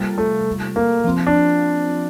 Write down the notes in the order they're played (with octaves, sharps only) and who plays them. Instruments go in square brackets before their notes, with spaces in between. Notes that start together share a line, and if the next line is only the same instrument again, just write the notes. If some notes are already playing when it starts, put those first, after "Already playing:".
Already playing: [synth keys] C3 G3 A#3 F4 A4
[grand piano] A3
A#3
[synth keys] F3 C4 F4
[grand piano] D4